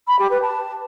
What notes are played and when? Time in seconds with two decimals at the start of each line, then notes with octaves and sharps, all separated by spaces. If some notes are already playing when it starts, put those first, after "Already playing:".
0.07 B5
0.19 G4
0.31 B4
0.42 A5